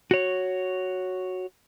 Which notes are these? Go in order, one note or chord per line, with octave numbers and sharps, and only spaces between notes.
F#4 C#5